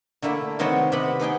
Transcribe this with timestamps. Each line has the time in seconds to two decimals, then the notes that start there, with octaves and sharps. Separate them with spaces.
0.22 D3 A3 A#3 E4
0.59 C3 D#3 B3 C4 F#4 C#5
0.92 C3 B3 G4 F#5 G5 B5
1.20 B3 D#4 G#4 G5